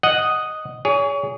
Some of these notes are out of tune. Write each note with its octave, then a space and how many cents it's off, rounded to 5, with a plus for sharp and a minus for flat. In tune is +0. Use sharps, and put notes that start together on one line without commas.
D#5 +0 F#5 +0
G#4 -10 C#5 +35